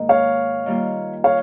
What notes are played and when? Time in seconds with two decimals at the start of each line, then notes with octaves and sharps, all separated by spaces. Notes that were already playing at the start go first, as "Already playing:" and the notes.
Already playing: G#2 D#3 A#3
0.09 C#5 F5
0.66 D#3 G3 A#3 F4
1.24 C#5 F5